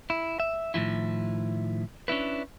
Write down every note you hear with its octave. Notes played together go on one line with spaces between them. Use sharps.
E4
E5
A2 D#3 F3 E4
C#4 D4 E4 B4